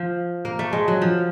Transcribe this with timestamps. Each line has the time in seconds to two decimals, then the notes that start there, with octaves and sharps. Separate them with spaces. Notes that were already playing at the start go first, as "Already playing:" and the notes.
Already playing: F3
0.45 A#3
0.59 A3
0.73 G#3
0.88 F#3
1.02 F3